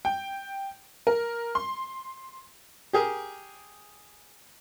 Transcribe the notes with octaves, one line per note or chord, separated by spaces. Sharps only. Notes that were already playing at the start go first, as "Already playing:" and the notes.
G5
A#4
C6
G4 G#4 A#4